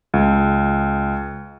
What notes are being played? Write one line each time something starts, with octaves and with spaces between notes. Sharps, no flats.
C#2